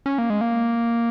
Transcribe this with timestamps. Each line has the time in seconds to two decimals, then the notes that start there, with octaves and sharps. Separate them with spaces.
0.06 C#4
0.18 A#3
0.30 G#3
0.41 A#3